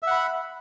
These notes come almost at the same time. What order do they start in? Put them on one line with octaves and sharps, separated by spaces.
E5 F#5 B5